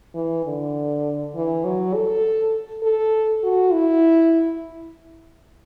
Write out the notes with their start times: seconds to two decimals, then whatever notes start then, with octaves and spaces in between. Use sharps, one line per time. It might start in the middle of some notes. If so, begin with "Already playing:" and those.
0.15 E3
0.45 D3
1.35 E3
1.64 F#3
1.94 A4
2.83 A4
3.44 F#4
3.73 E4